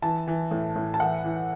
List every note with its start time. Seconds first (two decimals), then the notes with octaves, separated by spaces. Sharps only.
0.02 E3 A5
0.27 E3
0.51 A2
0.76 A2
0.94 A5
1.00 E3 F#5
1.25 E3